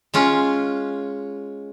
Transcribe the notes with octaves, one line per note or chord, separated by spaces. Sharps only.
G#3 C#4 F4